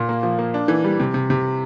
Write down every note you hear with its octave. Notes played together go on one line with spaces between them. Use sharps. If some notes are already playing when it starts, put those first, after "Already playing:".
Already playing: A#2
A#3
F3
A#3
D4
E3
G3
C3
C3
C3